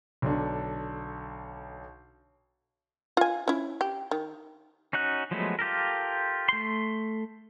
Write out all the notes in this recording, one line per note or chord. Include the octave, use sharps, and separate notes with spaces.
B1 D3
F4 G#5
C#4 E4
G4
D#3
C#4 D#4 F#4 F#6
F3 F#3 G#3 A3 B3
F4 G4 A4 A#4
A3 C6